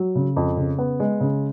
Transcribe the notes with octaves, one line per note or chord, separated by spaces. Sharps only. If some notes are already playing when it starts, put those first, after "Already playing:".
Already playing: F#3
C#3
F2
C#3
B3
G#3
C#3